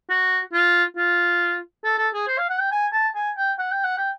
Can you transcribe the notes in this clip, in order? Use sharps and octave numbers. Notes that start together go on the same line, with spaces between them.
F#4
F4
F4
A4
A4
G#4
C5
F5
F#5
G5
G#5
A5
G#5
G5
F#5
G5
F#5
G5